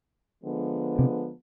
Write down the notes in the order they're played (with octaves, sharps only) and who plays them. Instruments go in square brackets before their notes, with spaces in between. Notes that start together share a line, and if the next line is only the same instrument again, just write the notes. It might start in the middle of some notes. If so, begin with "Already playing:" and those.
[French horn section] D3 F3 G#3 B3
[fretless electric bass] C3